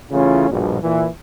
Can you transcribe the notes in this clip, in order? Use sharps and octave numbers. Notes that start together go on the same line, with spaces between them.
C#3 E3 A3 C#4 E4 F4
A#1 G2 B2
A#2 E3